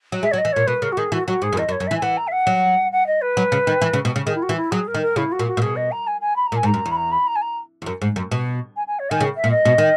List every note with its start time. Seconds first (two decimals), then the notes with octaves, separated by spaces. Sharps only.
0.12 F#3
0.23 G#3 E5
0.31 F#3 C#5
0.38 D#5
0.45 E3
0.52 A#2 C#5
0.67 B2 B4
0.82 C#3 A#4
0.92 F#4
0.97 D#3 G#4
1.12 E3 F#4
1.28 F#3 F#4
1.42 G#2 G#4
1.53 F#2
1.57 E2 D#5
1.69 F#2
1.72 C#5
1.80 F#2
1.87 E3 E5
1.97 G#5
2.02 E3 F#5
2.17 A#5
2.27 E5
2.32 F#5
2.47 F#3
2.92 F#5
3.07 D#5
3.21 B4
3.37 F#3
3.52 C#3
3.67 D#3
3.82 E3
3.93 C#3
4.05 B2
4.16 C#3
4.26 D#3 G#4
4.35 E4
4.42 F#4
4.49 E3
4.56 E4
4.71 F#3 G#4
4.87 A#4
4.94 D#3
5.02 A#4
5.16 C#3 E4
5.32 F#4
5.39 A#2
5.47 F#4
5.57 A#2
5.62 B2 G#4
5.76 D#5
5.91 A#5
6.07 G#5
6.21 G#5
6.36 B5
6.47 A#5
6.52 A#2
6.56 G#5
6.63 G#2
6.66 A#5
6.74 F#2
6.86 E2
6.91 B5
6.96 A#5
7.12 B5
7.27 A#5
7.36 G#5
7.42 A#5
7.82 E2
7.86 F#2
8.02 G#2
8.16 F#2
8.31 B2
8.76 G#5
8.87 G#5
8.99 C#5
9.10 D#3 G#5
9.20 C#3
9.37 E5
9.44 A#2
9.51 D#5
9.65 B2
9.78 D#3